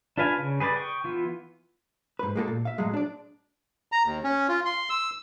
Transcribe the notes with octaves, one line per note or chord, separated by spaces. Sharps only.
D4 F4 B4 F5 G#5
C#3
G#4 B4 C5 D5
G5 C#6 D#6
E3 B3 F4
G#2 B4
G#3 A#3 G4 A4
A#2
E5 F5
A2 F#3 G#3
D4 D5
A#5
D#2
C#4
F4
C6
E6